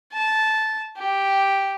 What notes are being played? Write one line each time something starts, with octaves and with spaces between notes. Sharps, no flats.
A5
G4